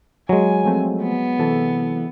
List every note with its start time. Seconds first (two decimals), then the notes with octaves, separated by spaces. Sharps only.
0.29 F#3 G#3 G#5
0.64 F3 A3 C4
1.02 B3
1.39 C3 E3 A4